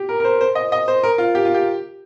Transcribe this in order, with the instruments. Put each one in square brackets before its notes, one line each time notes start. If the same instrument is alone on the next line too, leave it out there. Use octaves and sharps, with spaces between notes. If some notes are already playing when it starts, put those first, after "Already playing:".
Already playing: [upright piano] G4
A#4
A#4
C5
C5
D#5
D#5
C5
A#4
F4
G4
F4
G4